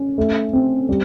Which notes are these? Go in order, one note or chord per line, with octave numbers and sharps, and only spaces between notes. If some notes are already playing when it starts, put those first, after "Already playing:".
Already playing: C#4
A3
C4
G3